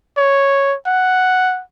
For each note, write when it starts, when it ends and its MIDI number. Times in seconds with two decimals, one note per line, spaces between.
0.17 0.75 73
0.86 1.61 78